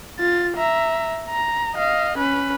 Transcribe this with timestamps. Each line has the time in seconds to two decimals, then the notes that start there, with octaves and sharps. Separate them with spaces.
0.19 F4 A6
0.57 E5 A#5
1.31 A#5
1.75 D#5 F5
2.18 C#4 B4